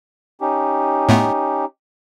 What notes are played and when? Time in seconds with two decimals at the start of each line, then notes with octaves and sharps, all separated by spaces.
0.41 C#4 D#4 G4
1.09 A2 A3 B3